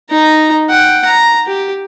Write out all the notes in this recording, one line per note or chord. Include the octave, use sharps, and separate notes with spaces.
D#4 A#5
F#5 G5
A#5
G4